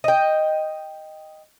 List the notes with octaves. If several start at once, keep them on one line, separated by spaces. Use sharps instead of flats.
D#5 G5